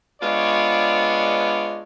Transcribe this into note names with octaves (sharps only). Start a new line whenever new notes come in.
G#3 B3 D4 F4 C#5 D5